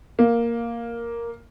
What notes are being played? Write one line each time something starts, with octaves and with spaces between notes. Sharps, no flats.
A#3